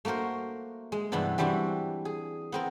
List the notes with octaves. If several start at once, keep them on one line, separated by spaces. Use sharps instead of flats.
A3 A#3 F#4 A#4 C5
G#3
G2 C3 E3 B3 D4 E4
E3 G3 C4 D4 E4 F#4
G#4
B3 C4 A#4